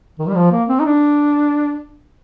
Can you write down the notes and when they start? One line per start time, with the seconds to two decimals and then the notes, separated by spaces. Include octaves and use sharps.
0.19 D#3
0.28 G3
0.36 F3
0.52 A#3
0.69 C4
0.80 D#4
0.85 D4